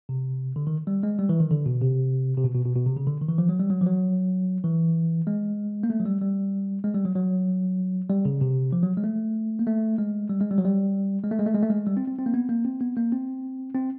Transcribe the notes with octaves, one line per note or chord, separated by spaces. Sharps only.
C3
D3
D#3
G3
G#3
G3
E3
D#3
D3
B2
C3
C3
B2
B2
B2
B2
C3
C#3
D3
D#3
E3
F3
F#3
G3
F#3
F3
F#3
E3
G#3
A#3
A3
F#3
G3
G3
G#3
G3
F#3
F#3
G3
C#3
C3
F3
F#3
G#3
A3
A#3
A3
G#3
G3
G#3
G3
F#3
G3
G#3
A3
G#3
A3
G#3
A3
G#3
G3
C4
C4
C4
A#3
B3
A#3
C4
B3
A#3
C4
C4